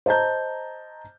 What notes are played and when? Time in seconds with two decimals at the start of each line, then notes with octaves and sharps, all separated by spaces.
0.06 C5 D#5 A5 A#5 G6